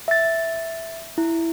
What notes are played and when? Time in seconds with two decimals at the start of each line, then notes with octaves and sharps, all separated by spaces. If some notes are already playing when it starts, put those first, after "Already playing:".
0.08 E5 A6
1.18 E4